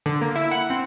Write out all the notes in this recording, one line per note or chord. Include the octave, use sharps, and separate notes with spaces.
D3
A#3
E4
F#5
C4